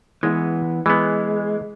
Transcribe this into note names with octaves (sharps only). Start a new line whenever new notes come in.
E3 G#3 B3
E3 G#3 B3